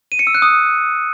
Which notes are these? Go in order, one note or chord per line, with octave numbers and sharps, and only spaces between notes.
D#7
C#7
E6
F#6
D#6